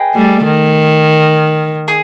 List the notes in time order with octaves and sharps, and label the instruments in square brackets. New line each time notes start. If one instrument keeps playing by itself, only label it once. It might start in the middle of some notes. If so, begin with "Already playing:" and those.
Already playing: [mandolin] G#4 B4 D#5 G5
[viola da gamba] G3 A3
D#3
[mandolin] G#4